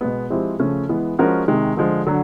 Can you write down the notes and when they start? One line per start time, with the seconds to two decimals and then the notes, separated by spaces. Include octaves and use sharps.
0.01 B2 G#3 B3
0.30 F3 G#3 C4 E4 G4
0.59 C#3 F3 A3 C#4
0.89 E3 G#3 B3
1.19 F3 G#3 C#4 F#4 A#4
1.48 C3 D#3 G#3
1.77 D3 F3 G#3
2.07 D3 F#3